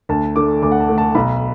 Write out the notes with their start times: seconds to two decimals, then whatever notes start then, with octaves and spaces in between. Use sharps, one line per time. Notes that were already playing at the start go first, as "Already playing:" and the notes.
0.09 D2 A5
0.36 D3 A3 D6
0.62 D2 D6
0.72 F#5
0.80 A5
0.89 D3 A3
0.98 A5
1.15 B1 B5